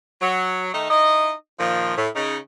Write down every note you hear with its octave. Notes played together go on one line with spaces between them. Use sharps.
F#3
D#3 A3 D#4
D#4 E4 D#5
A#2 D#3 F3
A2
C#3 D#4